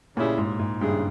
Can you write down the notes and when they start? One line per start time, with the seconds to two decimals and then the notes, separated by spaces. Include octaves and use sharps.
0.17 A#2 C#3 G3 C#4 E4 G#4
0.38 G#2
0.59 G#2
0.81 G2 C#3 G3 C#4 E4 G#4